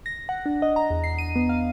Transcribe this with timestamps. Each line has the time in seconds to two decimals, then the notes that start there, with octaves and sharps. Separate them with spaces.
0.06 A#6
0.29 F#5
0.46 D4
0.62 D#5
0.76 A#5
0.90 E2
1.04 C7
1.18 D#7
1.36 B3
1.49 F5